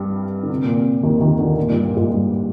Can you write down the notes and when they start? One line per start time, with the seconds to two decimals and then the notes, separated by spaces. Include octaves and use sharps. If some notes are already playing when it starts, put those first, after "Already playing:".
Already playing: G2 G3
0.43 D3
0.49 C3
0.64 A#2
0.77 C3
1.03 D#2 D#3
1.21 D#2 D#3
1.38 D2 D3
1.57 A#2
1.70 G2 G3
1.83 A#2 A#3
1.97 G#2 G#3
2.10 G2 G3